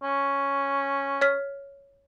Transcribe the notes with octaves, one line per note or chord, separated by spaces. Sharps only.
C#4
C#5 F6 B6